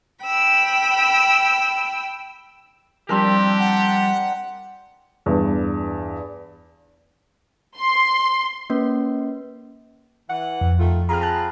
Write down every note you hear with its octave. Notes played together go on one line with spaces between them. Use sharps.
G5 B5 E6
F3 G3 C4 D4 G4 A#4
F#5
E2 G2
C6
A#3 C#4 B4
E3 F#5
F2
D#3 A3 F4
C4 F4 G#4 A#5 B5 F6
A5 A#5 F#6